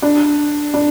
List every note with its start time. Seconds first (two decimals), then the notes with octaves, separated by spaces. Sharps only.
0.02 D4
0.74 D4